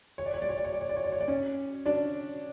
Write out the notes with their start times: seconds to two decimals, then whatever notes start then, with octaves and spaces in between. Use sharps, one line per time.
0.18 C#5
0.26 D5
0.34 C#5
0.42 D5
0.49 C#5
0.57 D5
0.64 C#5
0.73 D5
0.81 C#5
0.89 D5
0.96 C#5
1.04 D5
1.12 C#5
1.21 D5
1.28 C#4 C#5
1.86 D4 D5